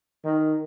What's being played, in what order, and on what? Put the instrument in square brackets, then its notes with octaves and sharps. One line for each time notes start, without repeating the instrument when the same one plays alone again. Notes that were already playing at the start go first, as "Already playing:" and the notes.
[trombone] D#3